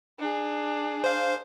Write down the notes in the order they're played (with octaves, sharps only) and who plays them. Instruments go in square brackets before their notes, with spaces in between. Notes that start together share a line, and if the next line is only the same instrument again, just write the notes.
[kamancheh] D4 G#4
[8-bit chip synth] C5 F5